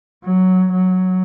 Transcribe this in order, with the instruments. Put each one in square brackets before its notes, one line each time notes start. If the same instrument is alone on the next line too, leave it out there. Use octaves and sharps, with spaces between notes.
[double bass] F#3
F#3